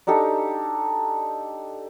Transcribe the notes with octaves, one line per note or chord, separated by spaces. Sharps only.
D4 D#4 G4 A4